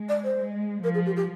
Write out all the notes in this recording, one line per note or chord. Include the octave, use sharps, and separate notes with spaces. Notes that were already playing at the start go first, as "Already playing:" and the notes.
Already playing: G#3
D5
C5
G#3
F3 A#4
G#4
G4
G4